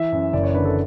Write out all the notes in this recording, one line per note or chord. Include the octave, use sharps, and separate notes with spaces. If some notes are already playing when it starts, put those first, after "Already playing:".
Already playing: E3 E5
F#2
F#1 D5
C#5
D3 B4
A4